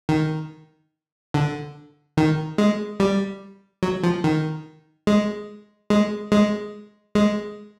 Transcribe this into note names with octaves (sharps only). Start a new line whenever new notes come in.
D#3
D3
D#3
G#3
G3
F#3
F3
D#3
G#3
G#3
G#3
G#3